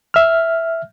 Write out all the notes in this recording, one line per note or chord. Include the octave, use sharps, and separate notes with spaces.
E5 F6